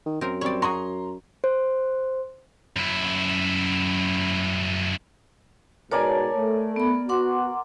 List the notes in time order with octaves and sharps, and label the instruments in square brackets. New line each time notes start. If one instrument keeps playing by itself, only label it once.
[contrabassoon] D#3
[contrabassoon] F#2 [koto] C4 A#4
[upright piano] G3 C4 [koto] C#5 D5
[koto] F#4 G#4 [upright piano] A#5 C6
[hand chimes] C5
[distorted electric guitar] F#2 E4
[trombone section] G#2 B2 [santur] A#4 D5 G#5 [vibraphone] C#5 A5
[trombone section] A3
[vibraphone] B3 B5
[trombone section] B3 F#4 [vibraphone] F#5 C6 D6